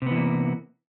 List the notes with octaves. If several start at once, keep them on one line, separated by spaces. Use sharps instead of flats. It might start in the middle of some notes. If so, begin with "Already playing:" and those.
C3 E3 A#3 B3